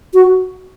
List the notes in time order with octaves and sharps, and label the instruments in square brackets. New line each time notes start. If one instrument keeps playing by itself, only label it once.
[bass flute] F#4